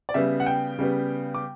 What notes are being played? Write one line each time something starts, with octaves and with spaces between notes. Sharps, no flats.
D5
C#3 G3 B3 E5
F#5
G5
C#3 G3 B3
D6